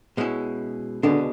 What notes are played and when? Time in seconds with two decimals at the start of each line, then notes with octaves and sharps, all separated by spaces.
0.17 B2 G#3 C#4 E4
1.03 C#2 B2 D3 G#3 D4